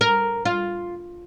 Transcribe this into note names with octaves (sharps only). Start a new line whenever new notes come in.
A#4
F4